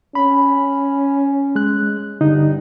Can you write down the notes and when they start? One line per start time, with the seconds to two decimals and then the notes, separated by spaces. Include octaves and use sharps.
0.15 C#4 B5
1.55 G#3 F#6
2.21 G2 D3 D#4